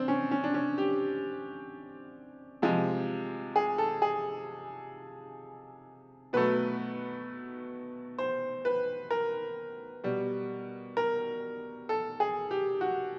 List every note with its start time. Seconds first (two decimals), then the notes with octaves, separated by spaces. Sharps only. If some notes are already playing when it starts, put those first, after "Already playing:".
Already playing: C4 D4
0.08 C#4
0.31 C#4
0.44 D4
0.54 C#4
0.78 G4
2.62 C3 F3 G#3
3.56 G#4
3.78 A4
4.02 G#4
6.33 B2 F#3 A3 B4
8.18 C5
8.65 B4
9.11 A#4
10.04 B2 G3
10.97 A#4
11.89 A4
12.20 G#4
12.51 G4
12.81 F#4